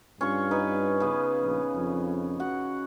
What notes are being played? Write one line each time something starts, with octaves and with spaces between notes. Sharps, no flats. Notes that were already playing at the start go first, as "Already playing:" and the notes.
G2 C#4 F4 C#6
D#4 B4
C#3 B3
A#1
F2
F#4 F#5